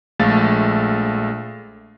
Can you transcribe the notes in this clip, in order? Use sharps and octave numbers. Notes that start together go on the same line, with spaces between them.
A#1 G#3 A3 A4 F5 A6